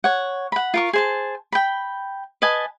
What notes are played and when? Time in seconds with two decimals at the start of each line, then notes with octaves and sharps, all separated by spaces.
0.04 C#5 F#5
0.52 F#5 B5
0.74 F4 A#4 C#6
0.93 G#4 C5 A5
1.52 G5 B5
2.42 B4 D#5 G#5 A5